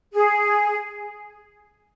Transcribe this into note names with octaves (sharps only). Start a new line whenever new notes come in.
G#4